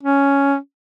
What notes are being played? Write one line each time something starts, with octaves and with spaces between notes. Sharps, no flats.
C#4